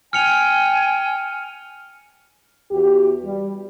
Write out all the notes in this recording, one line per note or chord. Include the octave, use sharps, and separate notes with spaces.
G5 G#5 F6 C#7 F7
E2 F#4 G4
G3